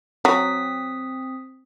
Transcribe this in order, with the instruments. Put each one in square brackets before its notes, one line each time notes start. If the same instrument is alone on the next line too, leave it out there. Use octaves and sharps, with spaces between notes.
[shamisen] F#3 [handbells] C4 D#6 B6